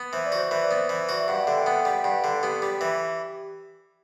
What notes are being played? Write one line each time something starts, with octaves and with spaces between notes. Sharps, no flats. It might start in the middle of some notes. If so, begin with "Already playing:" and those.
Already playing: B3
E3 C5
D5
F#4
C5
E3 B4
D5
B3
C5
E3 B4
F#4 D5
E5
G2 F#5
D3 E5
G5
B3 F#5
G3 G5
G2 F#5
D3
B3 G4
G3 G4
E3